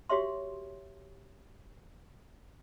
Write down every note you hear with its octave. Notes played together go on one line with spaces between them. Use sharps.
F#4 G4 C#5 E5 C6